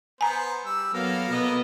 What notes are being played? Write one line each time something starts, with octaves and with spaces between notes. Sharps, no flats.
B3 C5 G#5 A#5
G3 E6
F#3 A#3 B3 A4 A#4 F5
B2 B3 D#5